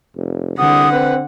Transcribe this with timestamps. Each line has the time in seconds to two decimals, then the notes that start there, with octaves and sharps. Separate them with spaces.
0.16 F1
0.58 C2 D3 F#5 D#6
0.92 C4 B4